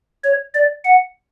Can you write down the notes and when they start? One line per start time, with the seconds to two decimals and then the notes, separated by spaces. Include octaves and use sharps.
0.24 C#5
0.54 D5
0.84 F#5